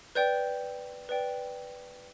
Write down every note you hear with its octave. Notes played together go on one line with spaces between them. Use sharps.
B4 D5 G5 G6
B4 D5 G5